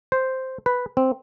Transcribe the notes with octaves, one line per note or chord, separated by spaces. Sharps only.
C5
B4
C4